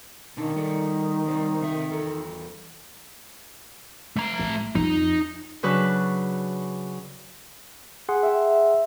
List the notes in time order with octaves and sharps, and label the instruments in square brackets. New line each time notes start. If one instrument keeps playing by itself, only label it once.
[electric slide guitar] B2 D4 A5 [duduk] D#3 [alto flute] D#4
[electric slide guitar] G3 A4 D5
G3 C5 D5
C3 A3 E5
E2 A4
[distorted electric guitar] A3 A#5
[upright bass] A1
[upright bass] F2 [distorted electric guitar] D#4
[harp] C#3 F#3 D4 B4 F#6
[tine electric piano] G#4 F#5 C6
[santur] E5 G5